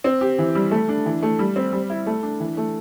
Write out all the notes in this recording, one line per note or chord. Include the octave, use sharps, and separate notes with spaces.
C4
G4
E3
G3
A3
D4
E3
A3
G3
C4
G3
E4
A3
D4
E3
A3